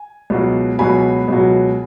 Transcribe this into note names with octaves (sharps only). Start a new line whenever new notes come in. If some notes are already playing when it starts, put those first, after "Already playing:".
Already playing: G#5
C#2 B2 F#3
C#2 B2 F#3 G#5 B5
C#2 B2 F#3